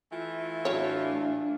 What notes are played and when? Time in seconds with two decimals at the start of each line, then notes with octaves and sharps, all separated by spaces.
0.11 E3 A3 F4
0.65 A2 F#3 D4 C#5 F5